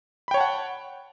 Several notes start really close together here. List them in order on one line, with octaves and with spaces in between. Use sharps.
B5 G5 C#5 A5 F#5